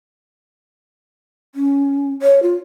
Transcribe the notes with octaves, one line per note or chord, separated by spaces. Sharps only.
C#4
C#5
F4